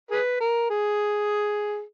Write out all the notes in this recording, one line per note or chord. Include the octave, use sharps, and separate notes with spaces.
G#4 B4
A#4
G#4